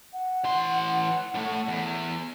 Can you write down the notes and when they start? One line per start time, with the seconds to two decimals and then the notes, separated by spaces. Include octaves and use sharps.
0.13 F#5
0.44 E3 C6
1.34 A2 A3
1.68 E2